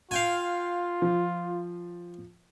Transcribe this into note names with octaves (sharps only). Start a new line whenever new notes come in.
F4 F5 G5 G#5
F3